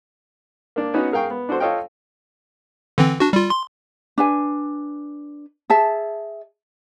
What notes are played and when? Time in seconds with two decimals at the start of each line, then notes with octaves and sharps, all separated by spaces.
0.76 A#3 D4
0.94 B3 C#4 D#4 F#4
1.12 G#4 A#4 F5 G5 C#6
1.30 B3
1.49 D4 F#4 A4 C5
1.60 F4 A4 C#5 D#5 F5 G5
2.98 D3 E3 C4
3.20 D4 F#4
3.33 G3 F4
3.50 C6
4.18 D4 B4 G#5
5.70 G#4 E5 A5